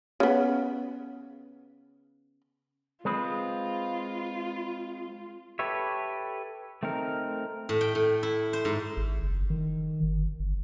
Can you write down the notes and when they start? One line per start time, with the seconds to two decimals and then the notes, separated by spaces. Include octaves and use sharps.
0.20 C#3 B3
3.05 G#3 C4 F4 B4
5.59 G4 A4 B4 C#5 E5
6.83 A3 C4 D#4 A#4
7.69 A2
7.81 G5
7.95 A2
8.23 E4
8.53 C5
8.65 G#2
8.97 G#1
9.23 F#1
9.50 D#3
10.03 G1
10.40 G1